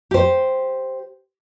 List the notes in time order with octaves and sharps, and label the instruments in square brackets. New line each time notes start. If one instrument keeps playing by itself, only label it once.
[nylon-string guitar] G4 C5